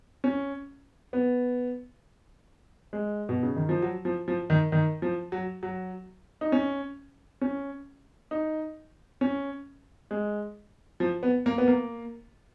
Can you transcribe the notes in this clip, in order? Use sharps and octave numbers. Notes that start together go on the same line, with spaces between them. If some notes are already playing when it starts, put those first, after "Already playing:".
C#4
B3
G#3
B2
C#3
D#3
F3
F#3
F3
F3
D#3
D#3
F3
F#3
F#3
D#4
C#4
C#4
D#4
C#4
G#3
F3
B3
A#3
B3
A#3